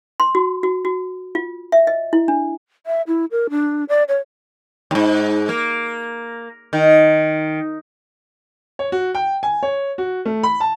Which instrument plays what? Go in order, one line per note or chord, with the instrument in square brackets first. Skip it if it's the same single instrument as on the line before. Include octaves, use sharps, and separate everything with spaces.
[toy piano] C6
F#4
F#4
F#4
F4
E5
D#5
E4
D4
[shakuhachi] E5
E4
A#4
D4
D5
C#5
[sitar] D#2 G#2
A#3
D#3
[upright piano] C#5
F#4
G5
G#5
C#5
F#4
A3
B5
A5